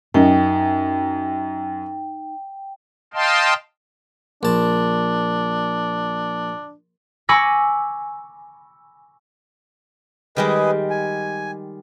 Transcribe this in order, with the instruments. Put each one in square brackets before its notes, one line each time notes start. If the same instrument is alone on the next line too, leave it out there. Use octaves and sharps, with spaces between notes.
[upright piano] F#2 [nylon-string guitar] D#4 [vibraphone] G5
[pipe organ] D#5 F5 G5 A5 C6
[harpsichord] A#1 A5 [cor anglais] D4
[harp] G#5 B5 C#6 D6 E6 A#6
[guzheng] D#3 G3 G#3 [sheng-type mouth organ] G#4 B4 D#5
[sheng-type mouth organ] G#5